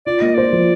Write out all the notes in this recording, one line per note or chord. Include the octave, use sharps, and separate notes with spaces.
F4 D5
A#3 D#5
C5 D5
F3